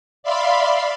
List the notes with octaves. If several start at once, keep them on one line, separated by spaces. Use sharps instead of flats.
D5 E5 F5 B5 C6